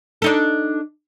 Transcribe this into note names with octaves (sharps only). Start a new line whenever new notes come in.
D4 D#4 A4